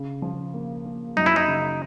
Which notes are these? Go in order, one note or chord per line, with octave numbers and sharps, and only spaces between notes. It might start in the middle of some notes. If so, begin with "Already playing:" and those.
Already playing: C#3
F3
A#3
A#3
F#2 D#4
E4
D#4
C#3